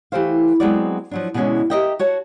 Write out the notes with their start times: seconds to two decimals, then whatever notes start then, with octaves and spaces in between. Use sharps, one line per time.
0.12 E3 A3 G4 A4 C5 F5
0.60 F#3 G#3 B3 C4 F#4 D5
1.11 F3 F#3 D4
1.34 B2 D3 E3 G#3 C#4 F#4
1.70 G4 A4 A#4 D#5 E5 G5
1.99 F#4 C#5 A5